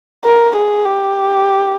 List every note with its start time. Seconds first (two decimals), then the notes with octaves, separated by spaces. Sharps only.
0.25 A#4
0.55 G#4
0.85 G4